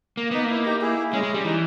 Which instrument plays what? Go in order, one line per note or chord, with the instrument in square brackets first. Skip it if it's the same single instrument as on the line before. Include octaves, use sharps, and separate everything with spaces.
[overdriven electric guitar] A#3
[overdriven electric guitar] B3 [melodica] D#4
[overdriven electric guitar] A#3
[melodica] E4
D#4 G4
E4 G#4
[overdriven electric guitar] G#3 [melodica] C#4
[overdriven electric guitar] G#3
G3
[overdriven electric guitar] E3 [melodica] D#4